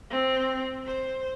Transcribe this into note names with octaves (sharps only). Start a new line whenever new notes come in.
C4
C5